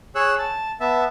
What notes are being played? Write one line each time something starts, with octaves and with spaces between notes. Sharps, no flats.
G#4 C#5 E6 F#6
A5
B3 E5 A5